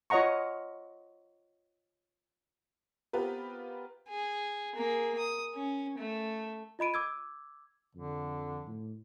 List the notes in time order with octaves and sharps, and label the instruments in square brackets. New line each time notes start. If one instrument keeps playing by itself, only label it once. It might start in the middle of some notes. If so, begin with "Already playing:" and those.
[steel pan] F4 C#5 D#5 F#5 A#5 C#6
[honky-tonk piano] B3 C4 F4 G4 A#4 B4
[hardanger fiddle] G#4
A#3 G#4
D#6
C#4
A3
[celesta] F4 D#5 B5 D7 D#7
D6 E6 G#6
[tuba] F2 [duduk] D3
[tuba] A2